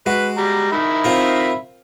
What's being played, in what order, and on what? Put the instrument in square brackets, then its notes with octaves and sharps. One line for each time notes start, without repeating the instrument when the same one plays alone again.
[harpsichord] G#3 F#4 [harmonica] B4
[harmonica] G3 A#5
D#3 E5 B5
[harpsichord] C4 F4 A#4